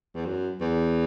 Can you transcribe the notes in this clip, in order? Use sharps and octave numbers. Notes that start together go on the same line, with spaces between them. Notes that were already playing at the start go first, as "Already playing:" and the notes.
E2
F#2
E2